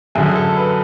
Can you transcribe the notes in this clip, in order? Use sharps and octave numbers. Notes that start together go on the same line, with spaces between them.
F#2 D3 G#4
A4
B4